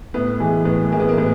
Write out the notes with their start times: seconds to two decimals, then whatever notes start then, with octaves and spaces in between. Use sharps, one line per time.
0.14 A2 B3
0.40 E3 G#3
0.65 A2 B3
0.91 E3 G#3 A#3
1.00 B3
1.09 A#3
1.18 A2 B3